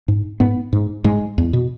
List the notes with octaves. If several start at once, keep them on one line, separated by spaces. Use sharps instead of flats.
G#2
G#2 B3
G#2
G#2 G#3
E2
B2